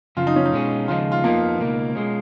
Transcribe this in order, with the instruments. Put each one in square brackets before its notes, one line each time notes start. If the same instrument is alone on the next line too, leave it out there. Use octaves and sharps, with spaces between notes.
[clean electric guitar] F#2 C#3 F3 [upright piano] F4
[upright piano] D#4
C#4
D#4
[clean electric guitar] B2 G#3 C#4
[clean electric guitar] D#2 C#3 F3 G#3 D#4 [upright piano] F4
[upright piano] F4
[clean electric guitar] F2 F3 B3 D#4 [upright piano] A#3
[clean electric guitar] C#2 B2 A#3 D#4
B2 G#3 C#4